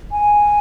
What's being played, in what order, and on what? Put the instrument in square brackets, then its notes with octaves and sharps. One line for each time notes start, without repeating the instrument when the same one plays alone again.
[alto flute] G#5